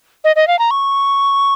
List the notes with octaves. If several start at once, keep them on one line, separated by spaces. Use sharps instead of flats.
D#5
D#5
F5
A#5
C#6